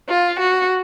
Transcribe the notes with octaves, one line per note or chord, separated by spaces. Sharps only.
F4
F#4